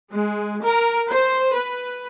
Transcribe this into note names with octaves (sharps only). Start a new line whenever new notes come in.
G#3
A#4
C5
B4